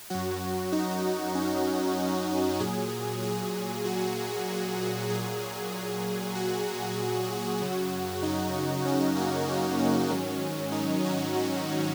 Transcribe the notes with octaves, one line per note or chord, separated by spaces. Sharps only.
F#2 F#3 F#4
D#4
C#4
A#2 F#3 G#4
G#4
F#4
A#2 F#3 G#4
F#4
F#2 C#3 F#3
D#4
C#4
A#3
A#3
C#4
G#2 D#3 F#3
D#4
F#4
F#4